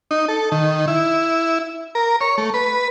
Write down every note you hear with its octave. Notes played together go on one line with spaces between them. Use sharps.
D#4
A4
D#3
E4
A#4
C#5
A3
B4